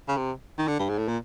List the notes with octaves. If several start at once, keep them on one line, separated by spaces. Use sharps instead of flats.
C#3
C3
D#3
D3
G2
G#2
A2
A#2